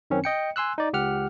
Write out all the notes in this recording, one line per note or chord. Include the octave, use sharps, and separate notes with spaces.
F#2 D#3 C4 C#4
D#5 G5 C#7
G#5 C6 E6 F#6
D#4 D5
C#2 G4 F#5 F6